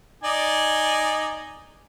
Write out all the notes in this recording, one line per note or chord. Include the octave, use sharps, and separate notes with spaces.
D#4 D5 G#5